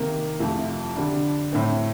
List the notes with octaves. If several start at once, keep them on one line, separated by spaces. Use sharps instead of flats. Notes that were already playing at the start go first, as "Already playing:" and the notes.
Already playing: C3 D#3 A#3
F2 C3 F3 A3
D3 G3 D4
A2 A3 C4